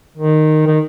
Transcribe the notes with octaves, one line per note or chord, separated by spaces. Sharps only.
D#3
D#3